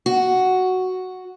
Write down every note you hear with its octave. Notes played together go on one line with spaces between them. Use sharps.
F#4